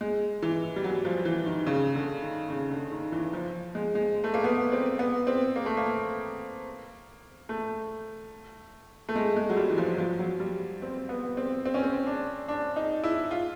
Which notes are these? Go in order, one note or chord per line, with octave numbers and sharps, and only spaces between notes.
G#3
E3
G3
F#3
F3
E3
D#3
C#3
D3
D#3
C#3
D3
D#3
E3
F3
G#3
G#3
A3
A#3
B3
C4
B3
C4
A#3
A3
A#3
A3
A3
G#3
G#3
F#3
G3
E3
F3
F#3
F3
F#3
G3
C4
B3
C4
C4
C#4
C4
D4
D4
D#4
E4
F4